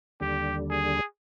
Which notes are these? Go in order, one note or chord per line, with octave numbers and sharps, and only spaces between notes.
D#2 D3 G3 G4
G#4